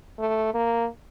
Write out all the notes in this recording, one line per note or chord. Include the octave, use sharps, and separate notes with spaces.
A3
A#3